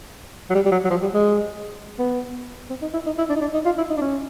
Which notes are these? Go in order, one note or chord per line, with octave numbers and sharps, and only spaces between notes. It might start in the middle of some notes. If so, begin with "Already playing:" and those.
F#3
G3
G3
F#3
F#3
F3
G3
G#3
B3
C4
D#4
E4
D#4
E4
D4
D#4
D4
D#4
F4
E4
D#4
D4
C#4